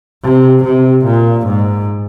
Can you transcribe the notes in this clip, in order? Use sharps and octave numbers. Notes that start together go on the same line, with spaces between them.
C3
C3
A#2
G#2